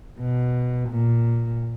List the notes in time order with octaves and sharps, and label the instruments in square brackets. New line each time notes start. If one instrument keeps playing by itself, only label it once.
[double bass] B2
A#2